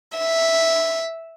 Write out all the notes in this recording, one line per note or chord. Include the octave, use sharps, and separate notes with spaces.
E5